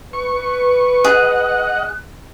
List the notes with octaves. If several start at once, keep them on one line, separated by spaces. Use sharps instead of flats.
B4 C#6
G#4 D#5 F#5 F#6